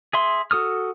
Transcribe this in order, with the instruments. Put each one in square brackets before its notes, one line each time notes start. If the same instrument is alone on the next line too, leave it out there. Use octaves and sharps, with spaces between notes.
[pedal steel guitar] G#4 E5 C6
F#4 A4 D#6 F6